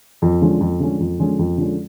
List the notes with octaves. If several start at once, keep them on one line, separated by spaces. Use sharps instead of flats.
F2
D3 F3 G#3 C#4
F2
D3 F3 G#3 C#4
F2
D3 F3 G#3 C#4
F2
D3 F3 G#3 C#4